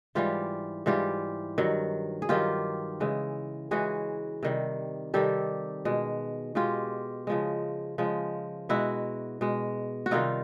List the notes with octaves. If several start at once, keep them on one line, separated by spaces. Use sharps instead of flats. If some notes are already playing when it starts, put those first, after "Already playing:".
G#2 E3 G3 F4 G4
G#2 E3 G3 F4 G4
G2 D#3 F#3
G#4
G2 D#3 F#3 F4 G4
C#3 E3 G#3
C#3 E3 G#3 F#4 G#4
C3 D#3 G3
C3 D#3 G3 G4 A4
B2 G#3
B2 G#3 F4 G4
C#3 F3 G#3
C#3 F3 G#3
B2 G#3 E4 F#4
B2 G#3
F#4
C3 D#3 G3 D#4 F4